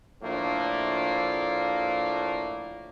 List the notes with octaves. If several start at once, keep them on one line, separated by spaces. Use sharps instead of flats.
A2 F3 A3 A#3 D4